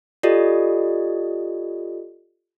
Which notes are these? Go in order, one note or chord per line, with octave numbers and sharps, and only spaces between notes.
F4 G4 A4 D5 D#5